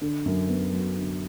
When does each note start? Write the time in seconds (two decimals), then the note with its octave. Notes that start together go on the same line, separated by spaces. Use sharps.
0.01 D3
0.26 F#2
0.49 B3
0.73 F#3
0.97 D3